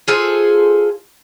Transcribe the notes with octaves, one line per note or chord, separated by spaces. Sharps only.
F4 G#4 A4 C5